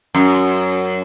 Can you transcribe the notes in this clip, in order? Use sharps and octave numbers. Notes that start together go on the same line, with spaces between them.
F#2